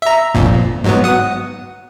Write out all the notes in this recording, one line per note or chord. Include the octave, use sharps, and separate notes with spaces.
E5 A#5
G1 F2 A#2
G#2 F#3 B3
F#5 D#6